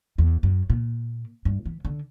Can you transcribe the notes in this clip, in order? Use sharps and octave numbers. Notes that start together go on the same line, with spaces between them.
E2
F#2
A#2
G2
E3
D3